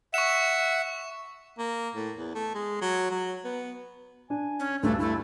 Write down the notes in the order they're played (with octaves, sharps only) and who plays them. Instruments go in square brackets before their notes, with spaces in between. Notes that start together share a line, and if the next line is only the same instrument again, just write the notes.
[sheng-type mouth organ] E5 F#5 [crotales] C#6 E7
[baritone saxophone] A#3
A2
E2
A3
G#3
F#3
F#3
B3
[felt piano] D4 [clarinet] G#5
[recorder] C#4
[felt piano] D2 G2 [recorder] A3 [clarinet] D4
[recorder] A3 [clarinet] E4